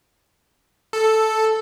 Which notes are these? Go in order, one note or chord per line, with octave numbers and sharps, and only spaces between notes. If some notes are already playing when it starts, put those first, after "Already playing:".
A4